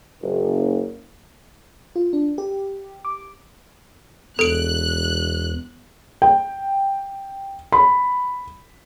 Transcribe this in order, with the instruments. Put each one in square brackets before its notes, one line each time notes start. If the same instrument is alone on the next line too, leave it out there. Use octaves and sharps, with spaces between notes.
[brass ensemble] F#1
[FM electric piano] F4
D4
G4
D6
[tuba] E1 [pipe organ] E2 [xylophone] A4 D7 [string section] F#6
[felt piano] G5
B5